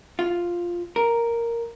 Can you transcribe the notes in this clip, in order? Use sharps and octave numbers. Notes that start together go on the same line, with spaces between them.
F4
A#4